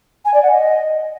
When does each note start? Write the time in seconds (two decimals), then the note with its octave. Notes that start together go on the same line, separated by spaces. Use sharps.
0.25 G#5
0.33 D5
0.42 F#5
0.51 D#5